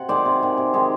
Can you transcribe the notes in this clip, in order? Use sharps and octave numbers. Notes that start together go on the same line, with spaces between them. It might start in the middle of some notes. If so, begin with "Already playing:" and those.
Already playing: C3 F#5
D#3 G#3 C5 D5
C3
D#3 G#3
C3
D#3 G#3